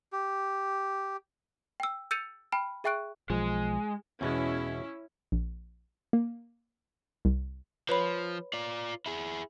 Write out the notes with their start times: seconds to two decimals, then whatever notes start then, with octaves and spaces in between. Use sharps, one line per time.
0.13 G4
1.80 G5 E6
2.11 E6 G6 A6 C#7 D#7 F7
2.52 G5 A5 B5 F6
2.84 G#4 E5 G5 C#6 F#6 D7
3.30 B1 F3 G#3
4.21 E2 B2 G#3 C#4 E4
5.32 A#1
6.13 A#3
7.25 C2
7.89 F3 B4 C#5 B5
8.53 F4 D5
9.06 E4 G#4